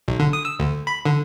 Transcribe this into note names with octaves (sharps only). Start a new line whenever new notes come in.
B1
D3
D#6
E6
D2
B5
D3